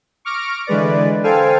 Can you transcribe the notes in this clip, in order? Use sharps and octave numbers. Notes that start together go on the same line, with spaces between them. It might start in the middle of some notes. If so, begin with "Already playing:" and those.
C#6 D6 F6 A#6 D7
D3 E3 G#3 B4 D5
A4 C5 F5 G5 G#5